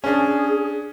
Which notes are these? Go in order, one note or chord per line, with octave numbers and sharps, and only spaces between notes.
C#4 D4 G#4